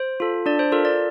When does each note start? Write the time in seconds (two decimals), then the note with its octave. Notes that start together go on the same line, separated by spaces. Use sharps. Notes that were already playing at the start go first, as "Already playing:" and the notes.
Already playing: C5
0.20 F4 A4
0.46 D4 D5
0.59 C5
0.72 F4 A4 A#4
0.85 D5